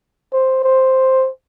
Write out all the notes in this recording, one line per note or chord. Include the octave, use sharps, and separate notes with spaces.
C5
C5